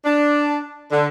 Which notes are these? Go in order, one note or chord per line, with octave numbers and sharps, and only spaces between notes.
D4
D3